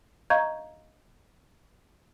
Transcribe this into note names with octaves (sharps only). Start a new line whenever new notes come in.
D#5 F5 A#5 C#6 G6 G#6